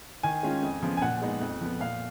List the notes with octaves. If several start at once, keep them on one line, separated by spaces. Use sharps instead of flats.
D#3 G#5
G#3 C#4 F4
F2
C#3 F3 B3 F4
G#5
A#2 F#5
G#3 B3 D#4
F2
F3 B3
A#2 F5